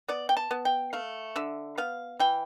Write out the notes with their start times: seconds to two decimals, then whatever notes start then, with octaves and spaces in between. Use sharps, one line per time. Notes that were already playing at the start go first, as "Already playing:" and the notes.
0.08 B3 D5
0.29 G5
0.37 A5
0.51 B3
0.65 G5
0.93 A3 F5
1.36 D3 E5
1.78 B3 F5
2.20 E3 G5